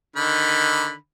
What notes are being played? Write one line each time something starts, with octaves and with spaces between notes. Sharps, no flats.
D3 D#3 B5